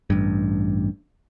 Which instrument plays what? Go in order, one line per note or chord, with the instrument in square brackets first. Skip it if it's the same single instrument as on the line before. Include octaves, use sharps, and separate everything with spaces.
[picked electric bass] A1 G2